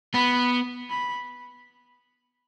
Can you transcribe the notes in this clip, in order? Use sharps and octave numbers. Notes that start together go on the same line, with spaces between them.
B3 B5
B5